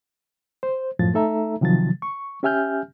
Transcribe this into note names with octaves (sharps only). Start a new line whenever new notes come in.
C5
F#2 A2 F3 A6
A3 D#4 A4 E5 A#5
C3 D#3 F3 F#3 A6
C#6
C#4 G4 E5 G#5 F6 G6